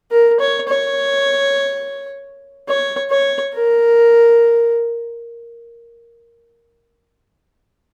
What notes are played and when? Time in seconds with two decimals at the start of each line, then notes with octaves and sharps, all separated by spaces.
0.11 A#4
0.40 C#5
0.69 C#5
2.68 C#5
3.11 C#5
3.54 A#4